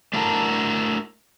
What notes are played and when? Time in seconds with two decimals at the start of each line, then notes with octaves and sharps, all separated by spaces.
0.13 A3 D4 E4 F#4 A4 A#4